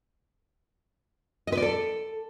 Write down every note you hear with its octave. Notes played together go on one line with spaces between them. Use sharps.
D#5
B4
D5
A4